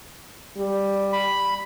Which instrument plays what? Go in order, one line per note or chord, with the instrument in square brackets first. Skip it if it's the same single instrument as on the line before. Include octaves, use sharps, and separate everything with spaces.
[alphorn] G3
[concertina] B5